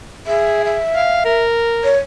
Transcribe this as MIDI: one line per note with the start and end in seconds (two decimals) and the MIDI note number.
0.27 0.77 68
0.27 0.63 76
0.65 1.42 76
0.95 1.22 77
1.25 1.92 70
1.84 1.98 73